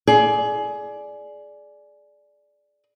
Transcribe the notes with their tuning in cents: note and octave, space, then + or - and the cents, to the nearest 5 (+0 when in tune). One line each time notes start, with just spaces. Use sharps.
G#4 +20 D5 +0